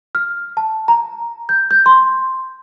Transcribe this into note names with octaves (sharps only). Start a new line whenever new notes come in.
F6
A5
A#5
G6
G6
C6